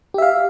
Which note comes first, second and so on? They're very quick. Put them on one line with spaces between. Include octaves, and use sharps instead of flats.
G4 E5 F5